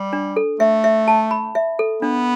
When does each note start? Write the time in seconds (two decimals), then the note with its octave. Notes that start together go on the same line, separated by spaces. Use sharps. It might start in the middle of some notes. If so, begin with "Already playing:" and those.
Already playing: G3
0.13 D4
0.36 A4
0.60 A3 E5
0.84 E5
1.08 A5
1.31 B5
1.55 E5
1.79 A4
2.02 B3 D4